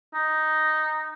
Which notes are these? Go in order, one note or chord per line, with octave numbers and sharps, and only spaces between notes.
D#4